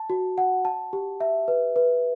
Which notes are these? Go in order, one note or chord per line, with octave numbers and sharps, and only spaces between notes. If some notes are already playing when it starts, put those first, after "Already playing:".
Already playing: A5
F#4
F#5
A5
G4
E5
B4
B4